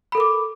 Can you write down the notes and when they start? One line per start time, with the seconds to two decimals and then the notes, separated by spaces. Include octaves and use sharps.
0.12 B5
0.15 A4
0.17 A#4
0.20 D6